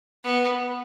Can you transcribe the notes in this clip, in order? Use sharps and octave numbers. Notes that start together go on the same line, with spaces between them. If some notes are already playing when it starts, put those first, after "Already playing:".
B3